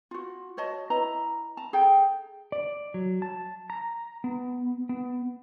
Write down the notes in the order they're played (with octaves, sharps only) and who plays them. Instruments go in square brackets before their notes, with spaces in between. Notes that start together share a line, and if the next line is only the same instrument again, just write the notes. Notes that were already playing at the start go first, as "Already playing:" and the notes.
[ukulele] F4 F#4
F#4 C#5 D#5 A5
E4 B4 D#5 A#5
A5 A#5
G#4 A4 G5
[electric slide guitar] D5
F#3
A5
A#5
B3
B3